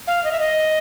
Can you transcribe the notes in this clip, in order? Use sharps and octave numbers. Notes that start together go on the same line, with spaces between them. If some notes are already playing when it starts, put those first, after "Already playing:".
F5
D#5
E5
D#5